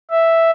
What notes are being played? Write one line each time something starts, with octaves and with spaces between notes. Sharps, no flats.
E5